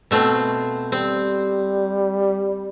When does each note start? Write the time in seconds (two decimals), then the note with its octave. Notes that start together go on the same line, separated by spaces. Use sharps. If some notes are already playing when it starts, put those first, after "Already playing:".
0.11 B2 A3 C4
0.92 G3 C4